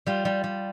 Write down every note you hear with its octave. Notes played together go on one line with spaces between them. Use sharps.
G3 F4
G3
G3